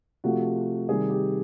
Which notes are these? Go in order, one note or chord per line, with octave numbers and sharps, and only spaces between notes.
C3 F3 A3 F#4
C3 D#3 G3 G#4
G4